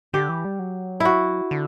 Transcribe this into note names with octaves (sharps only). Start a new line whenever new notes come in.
D3 G4
E3
G3
F#3
E4 F#4
D3